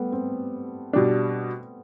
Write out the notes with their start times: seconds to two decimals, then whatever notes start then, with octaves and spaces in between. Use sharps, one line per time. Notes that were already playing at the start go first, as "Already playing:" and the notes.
Already playing: G3 A3 B3
0.12 C4
0.93 B2 G3 D4